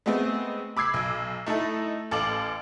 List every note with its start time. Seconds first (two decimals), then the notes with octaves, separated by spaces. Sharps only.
0.06 G#3 A3 B3 C4
0.77 B5 D6 E6 G#6 C7
0.94 B1
1.46 A3 D#4 E4 A4
2.11 A1 A4 F5 D6 F#7